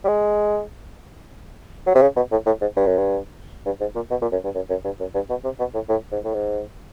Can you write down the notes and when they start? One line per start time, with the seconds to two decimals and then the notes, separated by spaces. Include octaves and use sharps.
0.04 G3
0.08 G#3
1.87 F#3
1.95 C3
2.02 C#3
2.16 B2
2.32 A2
2.46 A2
2.61 G#2
2.76 G2
2.87 F#2
2.98 G2
3.66 G2
3.80 G#2
3.95 A#2
4.11 B2
4.22 A#2
4.32 F#2
4.44 G2
4.55 F#2
4.70 F#2
4.85 G2
5.00 F#2
5.15 G2
5.30 B2
5.44 C3
5.59 B2
5.74 A2
5.89 A2
6.12 G#2
6.24 A2
6.34 G#2